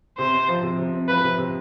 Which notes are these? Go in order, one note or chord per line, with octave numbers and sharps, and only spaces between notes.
C3 C5
C4
F3
C3
C3
C4
F3 B4
C3
C3